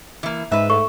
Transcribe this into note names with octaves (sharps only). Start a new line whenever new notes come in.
E3 A#3
G#2 B4 E5
A3 C#6